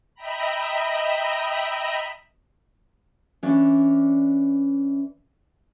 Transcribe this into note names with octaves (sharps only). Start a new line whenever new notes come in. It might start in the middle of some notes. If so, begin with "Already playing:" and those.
D#5 E5 G5 A#5 B5
E3 C#4 D4 D5